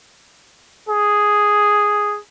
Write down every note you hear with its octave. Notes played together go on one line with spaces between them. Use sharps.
G#4